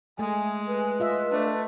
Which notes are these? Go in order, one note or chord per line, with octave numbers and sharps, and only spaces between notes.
G#3 A3 G#5
B4
F4 D#5 E5
A3 D4